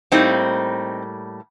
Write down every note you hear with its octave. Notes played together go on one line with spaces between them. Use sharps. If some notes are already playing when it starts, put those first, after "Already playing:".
A2 G3 A#3 C4 D#4